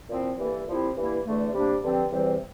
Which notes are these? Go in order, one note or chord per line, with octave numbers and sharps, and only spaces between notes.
A#2 F3 C4 E4
G2 E3 A#3 E4 A4
A#2 F3 C4 E4 G4
G2 E3 A#3 E4
E2 D3 A3
C3 G3 A#3 D4
G2 D3 F3 C4 G4
E2 C3 E3 G3 C4